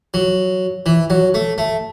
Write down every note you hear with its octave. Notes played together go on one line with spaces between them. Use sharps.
F#3
E3
F#3
A3
A3